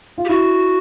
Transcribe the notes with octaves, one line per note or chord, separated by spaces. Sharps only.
F4
G4
E4 F#4